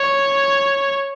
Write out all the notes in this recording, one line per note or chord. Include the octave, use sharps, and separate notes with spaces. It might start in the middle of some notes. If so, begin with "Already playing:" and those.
Already playing: C#5